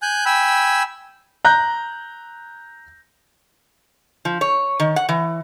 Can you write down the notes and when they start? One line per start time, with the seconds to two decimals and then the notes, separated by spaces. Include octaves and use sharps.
0.02 G#5 F#6 G6
0.26 G5 G#5 B5 E6
1.45 A#5 F#6 G6 A#6
4.25 F3
4.41 C#5
4.80 D#3
4.96 F#5
5.09 E3